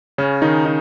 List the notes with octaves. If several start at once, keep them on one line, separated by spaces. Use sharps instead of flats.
C#3 C#4
D#3 D#4
D#4